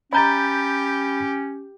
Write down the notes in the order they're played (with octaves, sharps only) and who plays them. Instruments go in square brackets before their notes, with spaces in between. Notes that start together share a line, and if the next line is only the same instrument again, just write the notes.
[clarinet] C#4 [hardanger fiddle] G4 [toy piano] D#5 A#5 [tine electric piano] B5 G6 A6